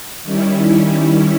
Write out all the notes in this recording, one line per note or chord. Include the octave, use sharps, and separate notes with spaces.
D#3 G3 C#4 E4